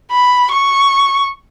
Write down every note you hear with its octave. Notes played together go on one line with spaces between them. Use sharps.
B5
C#6